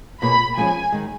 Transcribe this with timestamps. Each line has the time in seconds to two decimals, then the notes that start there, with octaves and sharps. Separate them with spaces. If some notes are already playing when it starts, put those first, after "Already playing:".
0.22 B2 A#3 F4 G#4 C#5 B5
0.57 F3 G#3 C#4 G#4 C#5 G#5
0.92 D#3 G#3